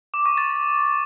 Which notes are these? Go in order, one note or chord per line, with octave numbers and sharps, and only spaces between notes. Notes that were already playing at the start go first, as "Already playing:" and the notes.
D6
C#6
A6